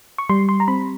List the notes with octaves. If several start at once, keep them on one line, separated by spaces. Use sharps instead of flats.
C#6
G3 C6
C6
A#5
C4 B5